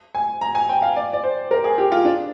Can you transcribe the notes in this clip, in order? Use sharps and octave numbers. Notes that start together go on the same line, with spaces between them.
G#5
A#5
G#5
G5
F5
D5
D5
C5
A#4
G#4
G4
F4
D4